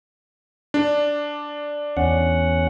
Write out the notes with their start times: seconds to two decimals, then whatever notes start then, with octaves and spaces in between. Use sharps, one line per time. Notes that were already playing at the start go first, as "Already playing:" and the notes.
0.74 D4
1.97 E2 C#4 F#5